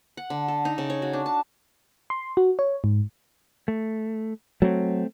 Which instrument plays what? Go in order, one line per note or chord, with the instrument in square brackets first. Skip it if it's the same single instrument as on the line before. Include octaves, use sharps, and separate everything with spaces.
[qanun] F#5
D3
A4
D#4
C#3
C#5
F#4
D4
A5
[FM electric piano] C6
F#4
C#5
G#2
[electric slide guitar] A3
[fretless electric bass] F#3 [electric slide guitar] A3 C4